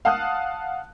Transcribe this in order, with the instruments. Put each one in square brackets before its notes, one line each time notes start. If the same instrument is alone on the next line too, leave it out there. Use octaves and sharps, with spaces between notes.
[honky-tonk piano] F5 F#5 A5 D#6 F6 F#6